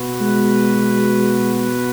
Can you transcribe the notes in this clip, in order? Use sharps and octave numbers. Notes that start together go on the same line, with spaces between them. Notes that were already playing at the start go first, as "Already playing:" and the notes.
Already playing: B2 B3 F#4 B4
G#3